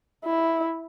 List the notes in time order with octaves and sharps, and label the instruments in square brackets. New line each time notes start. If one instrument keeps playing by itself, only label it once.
[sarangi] E4